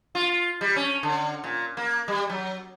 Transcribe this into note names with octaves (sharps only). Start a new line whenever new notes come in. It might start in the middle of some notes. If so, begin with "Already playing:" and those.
F4
G3
C#4
D3
A#2
A#3
G3
F#3